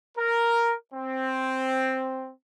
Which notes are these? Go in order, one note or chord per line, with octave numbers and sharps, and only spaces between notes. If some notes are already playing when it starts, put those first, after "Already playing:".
A#4
C4